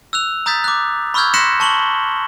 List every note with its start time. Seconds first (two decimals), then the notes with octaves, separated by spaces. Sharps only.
0.13 E6 F#6 F7
0.46 A#5 D#6 G6 A6 B6
0.64 D6 F#6
1.14 B5 C#6 E6 F6 G6 G#6
1.34 C6 F#6 A#6 B6 C#7 E7
1.60 A5 C#6 F#7 G7